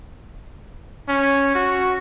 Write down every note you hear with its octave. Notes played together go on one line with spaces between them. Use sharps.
C#4
F#4